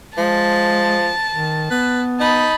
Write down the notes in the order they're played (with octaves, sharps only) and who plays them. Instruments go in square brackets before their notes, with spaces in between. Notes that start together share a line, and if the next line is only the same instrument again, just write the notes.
[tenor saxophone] F3 [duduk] G#3 [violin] A5
[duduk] D#3
[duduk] B3 [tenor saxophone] B4
[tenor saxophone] D#4 [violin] A5 B5